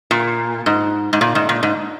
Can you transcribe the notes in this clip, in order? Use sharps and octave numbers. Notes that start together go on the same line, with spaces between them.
A#2
G#2
G#2
A#2
G#2
A#2
G#2